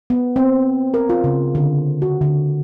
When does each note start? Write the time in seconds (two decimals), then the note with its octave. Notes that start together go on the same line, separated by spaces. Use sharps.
0.10 B3
0.36 C4
0.94 A#4
1.09 F4
1.24 C#3
1.55 D3
2.02 F#4
2.21 D3